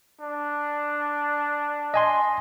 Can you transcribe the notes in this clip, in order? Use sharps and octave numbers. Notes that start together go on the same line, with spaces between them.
D4
D#5 G#5 C6